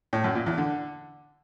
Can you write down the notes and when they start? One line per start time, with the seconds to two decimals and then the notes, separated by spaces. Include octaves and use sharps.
0.13 A2
0.24 F#2
0.35 A#2
0.46 E2
0.58 D3